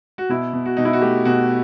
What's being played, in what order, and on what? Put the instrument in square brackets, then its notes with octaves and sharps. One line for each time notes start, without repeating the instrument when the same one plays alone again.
[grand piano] F#4
B2 E4
B2
F#4
B2 D#4
E4
F#4
A3 G4
B2 F#4